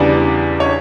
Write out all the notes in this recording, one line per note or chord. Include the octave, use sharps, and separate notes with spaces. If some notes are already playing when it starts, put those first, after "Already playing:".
Already playing: E2 C#3 E3 G3 D4 D5
C#5